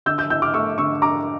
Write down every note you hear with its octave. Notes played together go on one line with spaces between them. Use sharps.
D3 E6 G6
E6 G6
E4 E6 G6
D6 F6
A3 C#6 E6
D3 C#6 E6
D3 A#5 D6